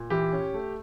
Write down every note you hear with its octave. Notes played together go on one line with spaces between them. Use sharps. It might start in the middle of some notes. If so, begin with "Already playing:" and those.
Already playing: A#2
E3 G4
C#4
A3